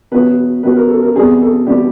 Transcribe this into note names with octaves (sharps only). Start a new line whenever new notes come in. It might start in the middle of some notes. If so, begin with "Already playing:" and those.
E2 B2 F#3 B4
E2 B2 F#3 B4
A#4
A4
A#4
E2 B2 G3 C4 G#4
A4
E2 B2 G3 C4 G4